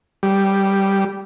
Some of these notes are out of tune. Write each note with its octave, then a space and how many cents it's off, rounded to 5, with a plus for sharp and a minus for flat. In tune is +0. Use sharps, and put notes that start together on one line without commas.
G3 -5